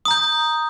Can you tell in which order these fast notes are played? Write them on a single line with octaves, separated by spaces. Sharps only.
D#6 A#5 G6